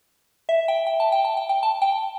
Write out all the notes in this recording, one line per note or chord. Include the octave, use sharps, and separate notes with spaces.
E5
G5
G5
A5
G5
A5
G5
G5
A5
G5